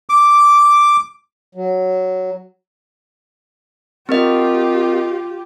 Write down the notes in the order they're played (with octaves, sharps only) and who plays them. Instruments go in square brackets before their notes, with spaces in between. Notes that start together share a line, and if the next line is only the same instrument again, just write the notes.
[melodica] D6
[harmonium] F#3
[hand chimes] C4 A#4 D#5 [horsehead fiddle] F4 G4